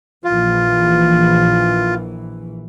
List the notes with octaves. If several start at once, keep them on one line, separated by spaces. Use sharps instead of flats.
A#1 E3 F4